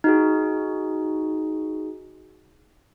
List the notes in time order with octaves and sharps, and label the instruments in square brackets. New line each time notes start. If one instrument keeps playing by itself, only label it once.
[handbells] D#4 F#4 G#4